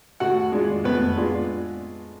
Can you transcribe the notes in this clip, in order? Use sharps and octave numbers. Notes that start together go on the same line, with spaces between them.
A2 F#4 F#5
G#3 D4 F4
A2 B3 B4
G#3 D4 F4